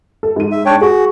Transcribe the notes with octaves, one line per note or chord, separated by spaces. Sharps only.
A4
G#2 D#7
E5
D4 C#5 G5
F#4 G#4